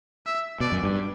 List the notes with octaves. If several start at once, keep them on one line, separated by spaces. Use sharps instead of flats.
E5
B2 D5
F#2
G2